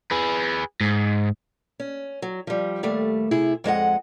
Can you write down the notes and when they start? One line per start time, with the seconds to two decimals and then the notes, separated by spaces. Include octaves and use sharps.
0.11 G#4 B4
0.81 G#2
1.80 C#4
2.22 F#3
2.47 F3 G3
2.83 D#2 G3 A3
3.31 C3 E4 G#4
3.64 F2 G#3 D#5 F#5